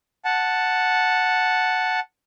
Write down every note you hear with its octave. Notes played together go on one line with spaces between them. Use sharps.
F#5 A5